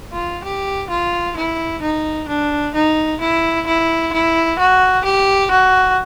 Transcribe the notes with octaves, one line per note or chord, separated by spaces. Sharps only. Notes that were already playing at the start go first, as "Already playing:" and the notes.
F4
G4
F4
E4
D#4
D4
D#4
E4
E4
E4
F#4
G4
F#4